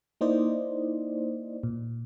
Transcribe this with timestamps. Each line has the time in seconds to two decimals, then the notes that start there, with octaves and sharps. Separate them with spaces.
0.21 A#3 D#4 E4 C5 D5 D#5
1.63 A#2